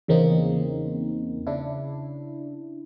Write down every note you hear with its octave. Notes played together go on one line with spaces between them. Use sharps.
E2 C#3 A#3 C4 D#4
C#3 D4 E4